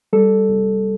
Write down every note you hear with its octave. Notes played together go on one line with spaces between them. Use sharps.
G3 A4
C2